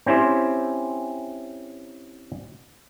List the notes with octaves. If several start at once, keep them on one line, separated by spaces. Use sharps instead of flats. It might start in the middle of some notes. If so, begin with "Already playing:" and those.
C4 C#4 E4 G4 C5